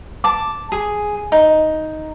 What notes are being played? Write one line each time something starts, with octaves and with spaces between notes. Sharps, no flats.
A5 D6
G#4
D#4